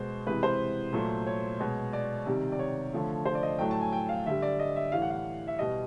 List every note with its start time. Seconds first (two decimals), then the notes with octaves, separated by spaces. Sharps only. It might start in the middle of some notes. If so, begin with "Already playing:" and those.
Already playing: B2 G#3 C5
0.26 C3 E3 G#3 B4
0.43 C5
0.93 A#2 F#3 A3
1.27 C#5
1.60 B2 G#3
1.93 D5
2.26 C3 D#3 G3
2.52 D5
2.59 C#5
2.93 D3 F3 A3
3.25 C5
3.35 D5
3.43 D#5
3.59 A2 F#3 A3 G5
3.71 A5
3.81 G#5
3.93 G5
4.09 F5
4.26 D3 G3 E5
4.42 D5
4.59 D#5
4.76 E5
4.92 A2 E3 G3 F5
5.02 F#5
5.10 F5
5.47 E5
5.59 B2 G3 D#5